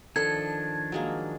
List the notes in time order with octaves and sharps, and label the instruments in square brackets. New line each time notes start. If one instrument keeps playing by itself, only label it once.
[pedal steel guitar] D#3 F3 D4 [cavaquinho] A4 [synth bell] G#6
[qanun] F#3 G#3 A#3